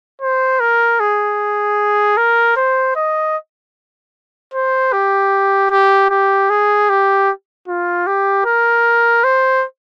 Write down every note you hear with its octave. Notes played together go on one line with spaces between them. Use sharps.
C5
A#4
G#4
A#4
C5
D#5
C5
G4
G4
G4
G#4
G4
F4
G4
A#4
C5